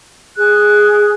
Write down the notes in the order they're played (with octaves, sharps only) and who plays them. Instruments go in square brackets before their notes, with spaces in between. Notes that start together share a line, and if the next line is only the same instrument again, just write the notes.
[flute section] G#4 F#6